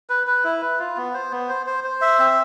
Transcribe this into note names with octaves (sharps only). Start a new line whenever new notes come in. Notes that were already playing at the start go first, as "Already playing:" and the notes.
B4
B4
E4
B4
F4
B3
C5
B3
C5
C5
C5
E5
C4